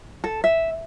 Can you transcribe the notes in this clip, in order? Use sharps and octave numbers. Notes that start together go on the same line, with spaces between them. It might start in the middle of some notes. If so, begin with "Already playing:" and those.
A4
E5